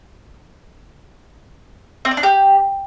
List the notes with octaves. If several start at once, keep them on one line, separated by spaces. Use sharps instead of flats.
C4
D5
D4
G4